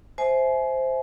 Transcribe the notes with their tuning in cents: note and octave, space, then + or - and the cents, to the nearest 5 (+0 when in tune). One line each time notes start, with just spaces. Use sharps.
C5 +0 E5 -10 G#5 +30